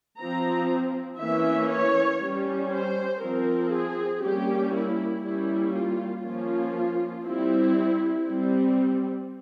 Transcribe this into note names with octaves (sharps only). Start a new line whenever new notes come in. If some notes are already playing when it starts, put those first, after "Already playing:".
F3 C4 A#5
E3 A#3 C#4 E5
C#5
G3 C#4
C5
F3 C4 A#4
G#4
G3 A#3 C#4 G4
E4
G3 A#3 C#4 E4
F4
F3 A#3 C#4 F4
G3 C4 E4
G3 C4